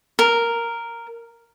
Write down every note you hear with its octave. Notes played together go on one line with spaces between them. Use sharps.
A#4